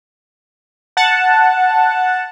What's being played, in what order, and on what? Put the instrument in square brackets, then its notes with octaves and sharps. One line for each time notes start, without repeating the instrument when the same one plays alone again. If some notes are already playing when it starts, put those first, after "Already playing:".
[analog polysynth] F#5 A5